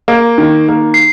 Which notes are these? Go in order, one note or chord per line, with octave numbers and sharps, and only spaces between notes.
A#3
D#3
A#3
C7